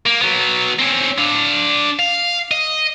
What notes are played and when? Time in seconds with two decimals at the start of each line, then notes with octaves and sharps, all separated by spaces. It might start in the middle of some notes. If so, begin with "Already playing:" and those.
0.06 A#3
0.22 F#3 B3
0.79 C4 C#4
1.18 D4 F5
1.99 F5
2.51 D#5